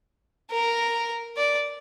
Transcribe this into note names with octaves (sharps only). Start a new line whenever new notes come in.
A#4
D5